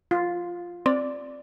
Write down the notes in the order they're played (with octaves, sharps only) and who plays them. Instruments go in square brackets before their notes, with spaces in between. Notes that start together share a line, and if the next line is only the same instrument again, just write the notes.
[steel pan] F4
[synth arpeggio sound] C4 [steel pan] D5